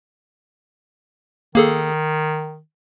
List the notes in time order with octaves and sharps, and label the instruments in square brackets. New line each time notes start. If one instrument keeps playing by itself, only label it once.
[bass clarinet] D#3 [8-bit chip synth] A#3 G#4 A4